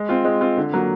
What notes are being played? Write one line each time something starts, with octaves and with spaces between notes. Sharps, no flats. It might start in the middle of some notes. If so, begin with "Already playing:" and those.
Already playing: G#3
C4 F4
G#3
C4 F4
D3
F#3 A#3